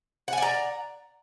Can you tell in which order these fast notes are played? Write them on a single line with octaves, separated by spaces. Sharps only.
F#5 G#5 D5 A#5